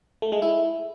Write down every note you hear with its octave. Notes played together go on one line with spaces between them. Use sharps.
A3
G#3
E4